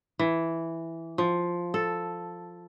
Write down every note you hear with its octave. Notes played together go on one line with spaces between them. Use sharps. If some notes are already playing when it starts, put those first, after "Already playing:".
E3
F3
A4